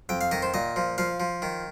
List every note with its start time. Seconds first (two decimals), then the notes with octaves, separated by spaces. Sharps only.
0.09 F2 G5
0.21 F5
0.31 D#3 D#5
0.42 C5
0.54 A#2 D#5
0.76 F3
0.98 F3 F5
1.20 F3
1.42 D#3